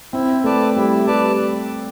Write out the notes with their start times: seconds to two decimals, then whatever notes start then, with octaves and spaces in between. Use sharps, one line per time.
0.13 C4 E4
0.44 A3 B4 D5 A5
0.76 G3 E4
1.07 G3 B4 D5 A5